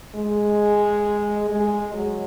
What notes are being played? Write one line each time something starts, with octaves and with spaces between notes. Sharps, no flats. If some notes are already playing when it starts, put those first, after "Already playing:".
G#3
G#3
F#3